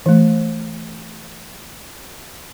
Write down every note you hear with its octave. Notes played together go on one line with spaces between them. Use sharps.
E3 A3